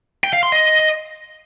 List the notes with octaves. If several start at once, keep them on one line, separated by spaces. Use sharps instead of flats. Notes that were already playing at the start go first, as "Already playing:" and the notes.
G5
F5
C6
D#5